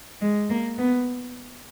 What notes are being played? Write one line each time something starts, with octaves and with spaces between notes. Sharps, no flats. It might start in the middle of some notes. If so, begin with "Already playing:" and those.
G#3
A#3
B3